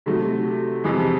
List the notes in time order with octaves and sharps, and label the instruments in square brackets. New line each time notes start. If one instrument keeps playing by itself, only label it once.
[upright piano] C3 D#3 F#3 A3
F2 C3 E3 G#3